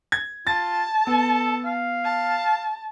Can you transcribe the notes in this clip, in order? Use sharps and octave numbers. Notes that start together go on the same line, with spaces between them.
G#6
F4 A5 A6
B3 A4
F5
A5